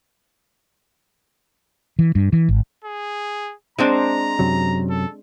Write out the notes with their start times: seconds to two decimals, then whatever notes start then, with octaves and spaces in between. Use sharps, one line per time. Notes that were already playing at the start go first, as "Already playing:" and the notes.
1.99 E3
2.15 G2
2.33 E3
2.49 G#1
2.84 G#4
3.79 G#3 C4 D4 A#5
4.39 F#2 C3 F#3
4.90 A4